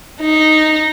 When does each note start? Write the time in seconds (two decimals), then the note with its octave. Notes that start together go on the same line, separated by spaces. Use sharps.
0.21 D#4